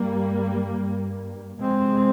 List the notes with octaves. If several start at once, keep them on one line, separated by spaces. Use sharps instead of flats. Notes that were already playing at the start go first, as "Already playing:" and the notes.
Already playing: G2 G3 A#3
G2
F2 C3 G#3 C4